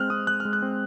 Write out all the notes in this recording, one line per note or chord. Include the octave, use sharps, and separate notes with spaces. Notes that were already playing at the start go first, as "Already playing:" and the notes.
Already playing: G#3 C4 F6 F#6
C4 D#6
G#3 F#6
G#3 F6
F#6
C4